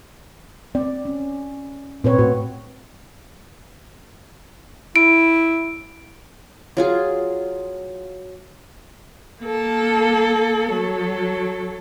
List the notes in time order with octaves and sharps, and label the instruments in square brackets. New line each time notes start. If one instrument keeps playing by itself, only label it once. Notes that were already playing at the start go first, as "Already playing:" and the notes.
[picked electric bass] C4 [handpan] D5
[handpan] C#4
[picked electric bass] A#2 [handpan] C4 B4 C#5
[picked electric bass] A2 [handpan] F#4
[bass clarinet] E4 [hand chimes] D7
[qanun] F#3 F4 G#4
[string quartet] A#3 A4
F#3 A4